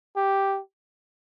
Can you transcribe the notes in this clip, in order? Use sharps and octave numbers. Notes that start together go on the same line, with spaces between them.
G4